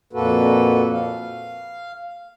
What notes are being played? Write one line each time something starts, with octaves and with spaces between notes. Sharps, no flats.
F2 A#2 A#3 F#4 A4 B4
F5